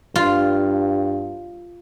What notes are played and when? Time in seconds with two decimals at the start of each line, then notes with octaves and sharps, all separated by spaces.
0.16 G2 F4